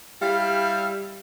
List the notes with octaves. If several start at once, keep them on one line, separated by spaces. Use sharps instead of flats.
G3 E4 G4 F5